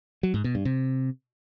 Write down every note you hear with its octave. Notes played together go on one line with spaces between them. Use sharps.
F#3
G#2
B2
G2
C3